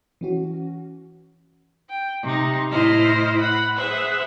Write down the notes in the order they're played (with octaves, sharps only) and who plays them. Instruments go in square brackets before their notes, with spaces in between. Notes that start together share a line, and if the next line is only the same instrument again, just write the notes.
[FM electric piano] E3 C#4 F#4
[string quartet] G5
C3 D#4
A2 E4 C5 D#5 F6 A#6
F#5 B5
G#4 B4 C5 E5 F#5